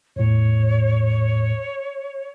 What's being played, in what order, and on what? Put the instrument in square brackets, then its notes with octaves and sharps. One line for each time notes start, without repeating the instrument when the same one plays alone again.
[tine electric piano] E2 A2 [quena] C#5